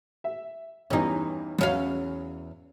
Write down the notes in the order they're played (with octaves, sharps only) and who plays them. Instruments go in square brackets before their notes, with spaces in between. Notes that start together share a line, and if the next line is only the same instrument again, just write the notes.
[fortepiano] E5
[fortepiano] E2 G2 E3 [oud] C#4 D#4
[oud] E2 C#4 F5 [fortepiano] F#3